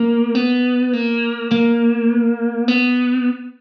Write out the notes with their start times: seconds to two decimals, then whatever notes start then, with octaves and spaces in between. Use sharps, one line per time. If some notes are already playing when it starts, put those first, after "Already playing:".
Already playing: A#3
0.35 B3
0.93 A#3
1.52 A#3
2.68 B3